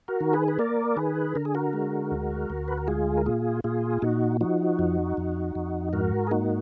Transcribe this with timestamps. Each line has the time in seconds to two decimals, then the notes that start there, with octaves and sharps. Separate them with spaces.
0.08 F#4 A#4
0.21 D#3
0.33 G#4 B4
0.48 B4
0.59 A#3 A#4 D5
0.97 D#3 G#4 B4
1.35 D3 A#4
1.45 G#4
1.55 F#4 A#4
1.73 G#3
2.11 D2
2.50 D2
2.68 B4
2.77 A#4
2.87 G#3 F4 G#4
3.17 A#4
3.26 A#2 F4 G#4
3.64 A#2 F4 G#4
4.02 A#2 D#4 F#4
4.41 F3 D#4 F#4
4.79 F2
5.17 F2
5.55 F2
5.93 G#2 F#4 A#4
6.27 G#4
6.31 A#3 D#4 F#4